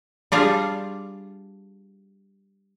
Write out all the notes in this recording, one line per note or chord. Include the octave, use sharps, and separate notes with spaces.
G3 D4 F4 G#4